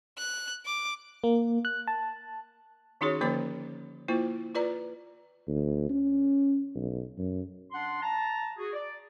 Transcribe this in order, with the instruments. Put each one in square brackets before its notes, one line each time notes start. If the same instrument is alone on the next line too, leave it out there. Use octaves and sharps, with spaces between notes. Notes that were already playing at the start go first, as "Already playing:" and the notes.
[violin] F#6
D6
[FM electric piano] A#3
F#6
A5
[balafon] D#3 C#4 D#4 F#4 G#4 C#5
D3 F3 A#3 C#4 C5 D6
A#3 E4 F4 C5
F4 B4 D5 A#5
[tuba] D2
C#4
B1
F#2
[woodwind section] D4 F#5 C6
A5 A#5
F#4 G#4
D5